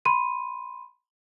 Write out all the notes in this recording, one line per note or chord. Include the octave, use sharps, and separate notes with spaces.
B5 C6 D#7